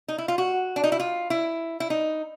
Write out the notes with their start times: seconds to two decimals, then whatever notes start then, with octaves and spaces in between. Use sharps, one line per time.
0.08 D#4
0.18 E4
0.28 F4
0.38 F#4
0.76 D4
0.84 D#4
0.92 E4
1.00 F4
1.30 E4
1.80 E4
1.90 D#4